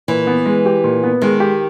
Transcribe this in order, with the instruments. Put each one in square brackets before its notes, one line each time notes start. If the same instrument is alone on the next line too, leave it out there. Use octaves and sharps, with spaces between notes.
[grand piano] A#2 [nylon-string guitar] E3
[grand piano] B3
G#3
G4
A#2
B3
[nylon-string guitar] D#3 [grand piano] G#3
[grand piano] G4